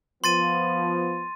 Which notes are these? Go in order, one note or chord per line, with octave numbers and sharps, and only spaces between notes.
F3 B3 C6 A6 D#7